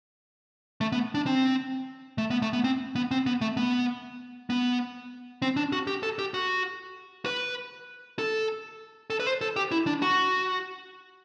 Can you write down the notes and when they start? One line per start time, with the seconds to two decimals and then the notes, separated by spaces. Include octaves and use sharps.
0.81 A3
0.92 B3
1.15 D4
1.26 C4
2.18 A3
2.31 B3
2.42 A3
2.53 B3
2.64 C4
2.95 B3
3.11 C4
3.26 B3
3.41 A3
3.57 B3
4.50 B3
5.42 C4
5.57 D4
5.72 F#4
5.87 G4
6.03 A4
6.19 G4
6.34 F#4
7.26 B4
8.19 A4
9.10 A4
9.20 B4
9.27 C5
9.41 A4
9.56 G4
9.72 E4
9.87 D4
10.02 F#4